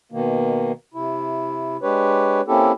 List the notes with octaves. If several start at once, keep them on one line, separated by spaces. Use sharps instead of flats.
B2 D#3 A#3
C3 E4
G#3 D4 G4 B4 C#5
A#3 C4 C#4 E4 G4 A4